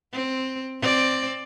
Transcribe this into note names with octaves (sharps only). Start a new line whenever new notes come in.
C4
C4 D5